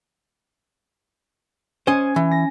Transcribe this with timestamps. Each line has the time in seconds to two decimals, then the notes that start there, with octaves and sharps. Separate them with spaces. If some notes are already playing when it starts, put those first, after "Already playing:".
1.87 C#4 C5 D#5 G#5
2.16 E3
2.31 A#6